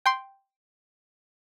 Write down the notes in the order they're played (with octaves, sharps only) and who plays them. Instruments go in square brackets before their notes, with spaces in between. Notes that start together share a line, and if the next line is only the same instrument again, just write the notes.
[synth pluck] G5 C6